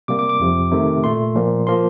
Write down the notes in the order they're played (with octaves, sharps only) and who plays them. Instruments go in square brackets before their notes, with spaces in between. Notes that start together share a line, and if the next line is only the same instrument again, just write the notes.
[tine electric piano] C3 G3 A#3 D6
D6
D6
F2 C3 F3
C3 D#3 A3
A#2 A3 C6
A#2 F3 A#3
F3 A#3 C6